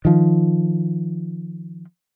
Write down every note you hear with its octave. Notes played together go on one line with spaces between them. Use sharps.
D#3 F3